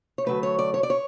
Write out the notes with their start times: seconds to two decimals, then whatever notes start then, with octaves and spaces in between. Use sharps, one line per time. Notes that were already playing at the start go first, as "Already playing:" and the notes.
0.18 C#5
0.26 D2 C#3 F#3 A3 B4
0.43 C#5
0.59 D5
0.74 C#5
0.83 D5
0.90 C#5